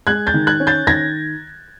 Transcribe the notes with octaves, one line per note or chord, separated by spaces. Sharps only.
G#3 F#6 G#6
G6 A6
D#3
F#6 G#6
C#4
G6 A6
D#3 G#6 A#6